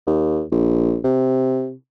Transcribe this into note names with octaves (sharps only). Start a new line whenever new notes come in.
D#2
A#1
C3